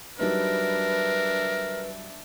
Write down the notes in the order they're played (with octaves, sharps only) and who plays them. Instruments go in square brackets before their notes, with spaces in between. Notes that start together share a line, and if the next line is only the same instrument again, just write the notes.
[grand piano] F#3 G3 D#4 [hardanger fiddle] D4 E5 [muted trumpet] A#4 [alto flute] B4